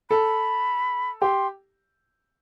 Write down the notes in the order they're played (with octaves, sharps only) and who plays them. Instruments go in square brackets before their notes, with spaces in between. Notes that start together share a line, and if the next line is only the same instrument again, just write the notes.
[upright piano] A4 [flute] B5
[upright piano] G4 [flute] C6